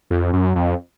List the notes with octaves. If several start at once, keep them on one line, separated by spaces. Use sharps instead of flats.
F2
F#2
F2